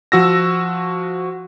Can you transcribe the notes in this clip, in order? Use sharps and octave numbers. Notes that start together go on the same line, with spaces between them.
F3 F#4 E6 A#6